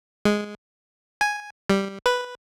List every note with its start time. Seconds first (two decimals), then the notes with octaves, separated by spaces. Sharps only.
0.25 G#3
1.21 G#5
1.70 G3
2.06 B4